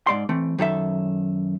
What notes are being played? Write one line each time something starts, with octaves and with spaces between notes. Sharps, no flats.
G#2 D5 C6
E3 A3 C4
F#2 D#3 A4 E5